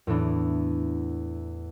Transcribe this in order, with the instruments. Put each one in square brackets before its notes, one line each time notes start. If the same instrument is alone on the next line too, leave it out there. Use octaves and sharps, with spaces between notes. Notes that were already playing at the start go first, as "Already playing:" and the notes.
[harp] E2 A2 E3 D4